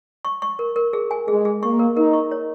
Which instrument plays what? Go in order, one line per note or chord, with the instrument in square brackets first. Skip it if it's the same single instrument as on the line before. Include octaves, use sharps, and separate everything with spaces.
[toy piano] C#6
C#6
A#4
A#4
G#4
G#5
[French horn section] G#3 [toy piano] G#4
[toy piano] G#4
[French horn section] A#3 [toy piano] C#6
[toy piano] A#4
[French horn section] D#4 [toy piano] A#4
[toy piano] C#6
C#5